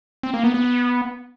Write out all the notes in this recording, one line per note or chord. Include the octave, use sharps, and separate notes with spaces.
C4
A#3
B3
B3
B3